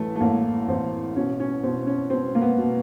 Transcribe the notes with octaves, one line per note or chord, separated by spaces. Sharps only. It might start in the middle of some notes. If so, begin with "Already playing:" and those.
Already playing: A1 E3 A3
A3
A1 A#3
A1 C4
B2 C#4
C#4
B2 C4
C#4
B2 C4
A#3
B3
B2